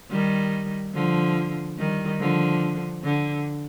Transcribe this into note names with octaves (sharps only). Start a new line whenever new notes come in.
D#3 G3
D3 F3
D#3 G3
D3 F3
D3